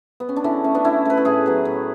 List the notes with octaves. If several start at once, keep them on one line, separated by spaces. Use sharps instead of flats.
B3
C#4
D4
D3 C#4 E4
A3 C#4
B3 D4
D3 C#4 E4
A3 B4
A4
A2 E4 G#4
F#3 B3
A2